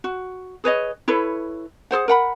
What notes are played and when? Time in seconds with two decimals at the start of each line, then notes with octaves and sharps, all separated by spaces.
0.04 F#4
0.64 G#4 B4 C#5 D#5
1.08 E4 A4 B4 C#5
1.91 G#4 A4 C5 F#5
2.08 A#4 F#5 B5